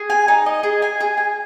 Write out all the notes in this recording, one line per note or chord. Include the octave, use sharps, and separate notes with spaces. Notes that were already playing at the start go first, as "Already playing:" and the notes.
Already playing: G#4
G#5
D#4
D#5
G#4
G#5
G#4
G#5